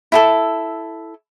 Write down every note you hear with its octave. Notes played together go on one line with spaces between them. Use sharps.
E4 G#4 A4